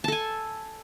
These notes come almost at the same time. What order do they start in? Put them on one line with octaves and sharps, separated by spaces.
A5 A4 G#5